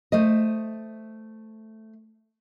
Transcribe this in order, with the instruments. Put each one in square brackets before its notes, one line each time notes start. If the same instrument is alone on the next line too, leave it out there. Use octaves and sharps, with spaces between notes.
[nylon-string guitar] A3 C5 D#5